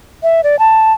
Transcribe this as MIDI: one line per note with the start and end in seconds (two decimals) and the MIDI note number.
0.23 0.41 76
0.44 0.59 74
0.59 0.93 81